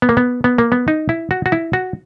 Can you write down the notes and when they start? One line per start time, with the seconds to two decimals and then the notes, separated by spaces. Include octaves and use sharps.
0.02 B3
0.09 A#3
0.17 B3
0.44 B3
0.58 A#3
0.72 B3
0.88 D#4
1.09 E4
1.31 F#4
1.46 F#4
1.52 E4
1.73 F#4